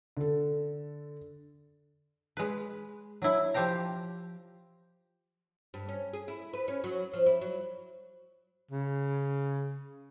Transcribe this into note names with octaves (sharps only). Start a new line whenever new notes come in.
D3 A4
G#3 B4
F#3 E4
F3 G4 C5 G5 A#5
G2
C#4
G#4
E4
B4
C#4
F#3
F3
E4
F#3
C#3